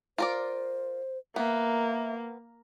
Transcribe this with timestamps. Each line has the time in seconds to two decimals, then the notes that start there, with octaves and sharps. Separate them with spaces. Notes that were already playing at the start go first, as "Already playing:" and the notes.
0.18 F4 A#4 C5 D5
1.36 A#3 B3 E5